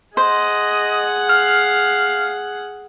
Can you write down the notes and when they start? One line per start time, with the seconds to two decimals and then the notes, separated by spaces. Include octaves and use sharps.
0.17 G#4 C5 D#5 F#5
1.30 F5 F6